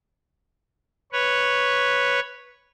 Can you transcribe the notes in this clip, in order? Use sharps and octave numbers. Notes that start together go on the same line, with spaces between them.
B4 C#5